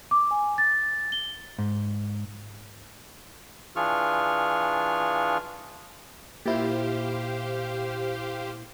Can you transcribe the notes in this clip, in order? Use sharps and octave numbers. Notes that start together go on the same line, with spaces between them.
D6
G#5
A6
G7
G#2
E3 D4 F4 G#4 C#6 F6
A#2 E4 G4 C5 F5